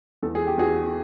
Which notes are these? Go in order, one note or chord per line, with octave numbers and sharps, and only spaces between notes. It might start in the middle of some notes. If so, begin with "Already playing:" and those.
E2 A4
G#4
G4
E2 F#4 G#4